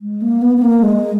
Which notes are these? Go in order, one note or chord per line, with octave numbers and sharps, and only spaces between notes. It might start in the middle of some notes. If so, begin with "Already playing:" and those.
G#3
A#3
B3
B3
A#3
G#3